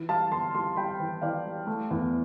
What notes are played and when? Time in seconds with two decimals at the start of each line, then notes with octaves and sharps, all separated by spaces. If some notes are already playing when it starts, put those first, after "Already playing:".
Already playing: E3
0.09 G3 F5 A5
0.31 G1 A5 C6
0.55 G3 A5 C6
0.76 G3 G5 B5
1.00 E3
1.22 E3 D5 F5
1.45 G3
1.67 A3
1.91 E2